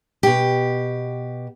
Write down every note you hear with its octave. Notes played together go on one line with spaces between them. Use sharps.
B2 G4